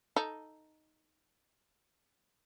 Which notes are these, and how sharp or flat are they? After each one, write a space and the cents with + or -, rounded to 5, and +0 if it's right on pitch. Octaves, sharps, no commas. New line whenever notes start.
D#4 +0 A4 +0